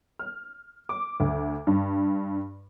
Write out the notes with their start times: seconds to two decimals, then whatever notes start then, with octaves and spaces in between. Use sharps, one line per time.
0.19 F6
0.89 D6
1.20 D2
1.67 G2